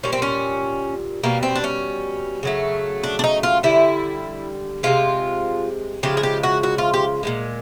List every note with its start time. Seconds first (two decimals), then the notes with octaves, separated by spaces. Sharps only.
0.03 A#2 G3 C#4
0.12 C4
0.22 C#4
1.23 B2 G3 A#3
1.43 C4
1.56 D4
1.64 C#4
2.43 C#3 F#3 A3
3.03 D4
3.19 D4
3.24 D#4
3.43 F4
3.63 D3 G3 E4
4.83 C3 E3 G#3 F4
6.03 C#3 F3 G#3 G4
6.17 G#4
6.23 G4
6.43 F#4
6.63 F#4
6.78 F4
6.94 G4
7.23 A#2 F3 G#3